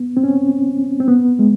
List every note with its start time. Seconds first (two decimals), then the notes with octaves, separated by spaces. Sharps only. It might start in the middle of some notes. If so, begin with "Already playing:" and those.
Already playing: B3
0.17 C4
0.24 C#4
1.00 C4
1.08 B3
1.39 G#3